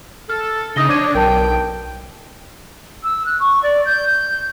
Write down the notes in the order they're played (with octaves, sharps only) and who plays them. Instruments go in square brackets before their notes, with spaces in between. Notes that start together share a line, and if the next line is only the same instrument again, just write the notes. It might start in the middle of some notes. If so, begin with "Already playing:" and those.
[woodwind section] A4 [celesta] F6
[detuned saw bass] C#3 [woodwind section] A3 D4 D#4 [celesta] D#6 A#6 G7
[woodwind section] F3 C5 C#5 [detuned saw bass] D4 [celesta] D6 G#6 D#7
[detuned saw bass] B1 [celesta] A#4 A5 [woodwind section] G5
[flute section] E6
F#6
C#6
D5
G6
G6